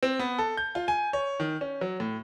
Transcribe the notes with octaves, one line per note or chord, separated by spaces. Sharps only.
C4
B3
A4
G6
F4
G#5
C#5
D#3
C#4
F#3
A2